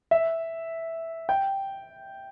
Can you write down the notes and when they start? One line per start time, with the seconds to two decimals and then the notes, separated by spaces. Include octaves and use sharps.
0.11 E5
1.29 G5